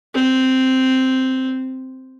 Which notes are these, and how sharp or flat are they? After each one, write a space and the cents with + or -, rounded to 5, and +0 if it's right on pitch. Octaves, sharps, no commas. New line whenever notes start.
C4 -5